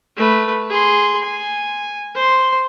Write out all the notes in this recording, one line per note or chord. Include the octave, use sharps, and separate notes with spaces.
A3 B4
G#4 C6
G#5
C5 C6